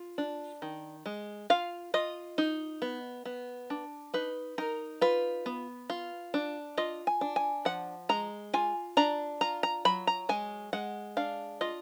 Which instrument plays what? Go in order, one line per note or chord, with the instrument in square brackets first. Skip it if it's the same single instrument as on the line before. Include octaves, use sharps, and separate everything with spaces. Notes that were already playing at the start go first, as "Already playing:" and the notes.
Already playing: [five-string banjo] F4
D4
D#3
G#3
F4 F5
F4 D#5
D#4
B3
B3
D4
D#4 B4
D#4 A#4
F4 B4
B3
F4
D4
F4 D#5
G#5
D4
G#5
F3 F#5
G#3 A#5
F4 G#5
D4 A#5
F4 A#5
A#5
F#3 B5
A#5
G#3 G#5
G#3 F#5
D4 F5
F4 D#5